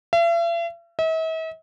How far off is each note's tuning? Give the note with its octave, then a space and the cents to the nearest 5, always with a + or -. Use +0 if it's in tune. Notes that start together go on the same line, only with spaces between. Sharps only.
E5 +45
E5 -45